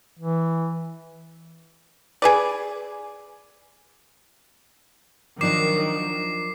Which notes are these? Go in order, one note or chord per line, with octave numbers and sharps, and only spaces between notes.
E3
G#4 B4 D5
D#3 F3 F#3 D4 A#4 D6 C7